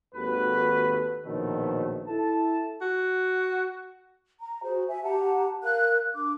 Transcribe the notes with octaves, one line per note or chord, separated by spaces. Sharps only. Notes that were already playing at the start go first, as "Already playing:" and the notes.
G#1 D#2 F#4 A4 B4
A#1 B2 D#3 F3 F#3 A3
E4 A4 A5
F#4
A#5
F#4 G#4 C5
E5 G#5
G4 F#5 A5 A#5
A#4 F5 F#6
D4 D6